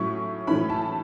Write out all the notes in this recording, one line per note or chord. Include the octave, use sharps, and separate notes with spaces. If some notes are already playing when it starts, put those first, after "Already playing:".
Already playing: A2 F#3 C#4 E4 C#6
A2 E3 C#4 E4 B5
A5